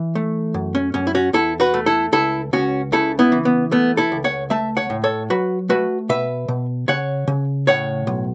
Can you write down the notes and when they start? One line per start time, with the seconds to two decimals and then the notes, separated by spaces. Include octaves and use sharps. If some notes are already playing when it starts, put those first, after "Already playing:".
Already playing: E3
0.15 A3
0.54 F#2
0.75 C#4
0.94 F#2 C#4
1.07 E4
1.15 C#4 F#4
1.33 E2 E4 A4
1.60 F#4 B4
1.74 A3
1.86 E4 A4
2.12 C#2 E4 A4
2.53 C#2 C#4 F#4
2.92 C#3 E4 A4
3.19 B3 E4
3.32 E3
3.45 B3
3.71 A3 B3
3.97 E4 A4
4.12 C#2
4.24 C#5 F#5
4.50 A3 E5 A5
4.77 C#5 F#5
4.90 A2
5.04 A4 C#5
5.30 F#3 F#4 B4
5.69 A3 F#4 B4
6.09 B2 B4 E5
6.48 B2
6.88 C#3 C#5 F#5
7.27 C#3
7.67 A2 C#5 F#5
8.07 B1